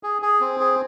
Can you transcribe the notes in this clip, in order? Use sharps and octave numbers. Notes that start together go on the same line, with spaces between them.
G#4
G#4
C4
G#4